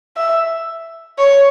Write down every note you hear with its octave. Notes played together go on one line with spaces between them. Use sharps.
E5
C#5